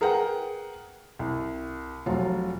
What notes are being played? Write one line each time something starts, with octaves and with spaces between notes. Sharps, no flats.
G#4 A#4 B4 F#5 G5
C2
F1 F#3 F4